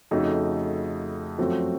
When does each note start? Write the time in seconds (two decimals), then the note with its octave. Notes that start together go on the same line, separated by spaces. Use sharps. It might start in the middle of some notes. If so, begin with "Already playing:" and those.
0.11 F2 C#3 A3 D#4 F#4
1.38 F#2 F3 A3 C4 F#4